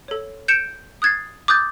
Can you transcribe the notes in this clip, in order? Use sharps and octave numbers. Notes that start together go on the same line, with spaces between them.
A4 C#5
G6 C#7 D7 E7
D#6 F#6 G#6 A6 C7
D6 D#6 F#6 G6 A6